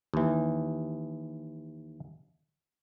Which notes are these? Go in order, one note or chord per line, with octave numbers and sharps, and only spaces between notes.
D#2 E3